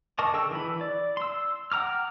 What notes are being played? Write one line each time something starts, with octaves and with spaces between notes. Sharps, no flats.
A#4 D#5 A5 C#6 D6
D3 G#4 G5 C#6 E6
E3 E4 B5
D5
C6 E6
F#5 G5 A#5 D6 F6